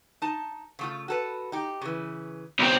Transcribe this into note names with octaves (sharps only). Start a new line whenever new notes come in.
D#4 A5
C#3 A3 F4
F#4 A4 B4
D#4 G4
C#3 E3
B1 C4